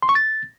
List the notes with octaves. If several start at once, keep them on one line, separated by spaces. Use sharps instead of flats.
C6
C#6
A6